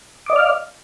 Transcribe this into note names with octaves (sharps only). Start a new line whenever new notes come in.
D5 D#5 F5 D6 F6